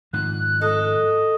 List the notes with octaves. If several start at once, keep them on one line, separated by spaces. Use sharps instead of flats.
G#2 D#3 F3 F#6
A4 D#5